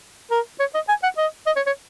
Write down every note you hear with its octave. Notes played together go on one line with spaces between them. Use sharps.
A#4
C#5
D#5
G#5
F#5
D#5
D#5
C#5
C#5